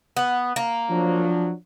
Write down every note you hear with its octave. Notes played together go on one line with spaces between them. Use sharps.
B3
A#3
F3 F#3 D4